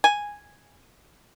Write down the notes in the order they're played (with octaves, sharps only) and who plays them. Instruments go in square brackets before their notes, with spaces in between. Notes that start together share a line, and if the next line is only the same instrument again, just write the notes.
[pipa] G#5